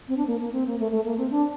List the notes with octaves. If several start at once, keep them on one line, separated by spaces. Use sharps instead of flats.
C4
D4
A#3
A#3
C4
A#3
A3
A3
A#3
C4
D4